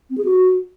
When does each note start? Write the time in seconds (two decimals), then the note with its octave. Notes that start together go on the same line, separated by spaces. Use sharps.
0.10 C4
0.18 G#4
0.25 F#4